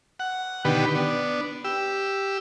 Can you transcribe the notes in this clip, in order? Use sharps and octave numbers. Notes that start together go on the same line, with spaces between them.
F#5
B2 D3 D#3 G4 B4
B3 D4
G4 E6